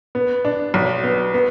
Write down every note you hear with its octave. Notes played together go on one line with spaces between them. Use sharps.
B3
D4
B1
B3
B3